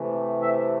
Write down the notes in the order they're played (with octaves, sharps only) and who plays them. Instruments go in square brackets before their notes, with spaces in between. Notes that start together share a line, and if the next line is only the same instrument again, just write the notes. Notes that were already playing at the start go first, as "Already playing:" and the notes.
Already playing: [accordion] C3 E3 A3
E5